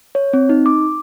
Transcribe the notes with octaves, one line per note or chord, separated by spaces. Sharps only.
C#5
C4
D#4
D6